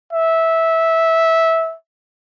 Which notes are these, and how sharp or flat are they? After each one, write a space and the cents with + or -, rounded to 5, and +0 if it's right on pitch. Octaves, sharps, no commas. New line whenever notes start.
E5 -15